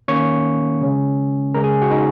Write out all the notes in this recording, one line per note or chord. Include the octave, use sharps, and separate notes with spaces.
D#3 A#3 C#4 C#5 C#6
C#3 G#3 C#4
C#3 G#3 C#4 A#4 A#5
G#4 G#5
F#4 F#5
D#4 D#5